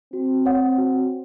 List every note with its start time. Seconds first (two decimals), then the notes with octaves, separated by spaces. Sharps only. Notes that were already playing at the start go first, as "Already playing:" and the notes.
0.13 C4 F#4
0.46 C#5 F#5
0.78 F#4